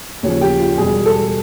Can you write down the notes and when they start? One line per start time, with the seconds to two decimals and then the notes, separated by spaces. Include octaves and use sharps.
0.23 D#2 C#3 F3 C#5
0.41 G4
0.60 F4
0.78 E1 E2 B2 G3 G#4
1.06 A4